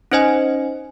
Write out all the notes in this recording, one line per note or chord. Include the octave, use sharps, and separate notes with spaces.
C#4 D#4 C5 D#5 G#5